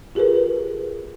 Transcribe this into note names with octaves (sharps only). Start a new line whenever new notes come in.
F4 G4 G#4 A#4 B4